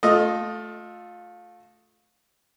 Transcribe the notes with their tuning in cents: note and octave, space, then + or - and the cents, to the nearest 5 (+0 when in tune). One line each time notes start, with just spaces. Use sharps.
A3 -10 F4 +25 D#5 -5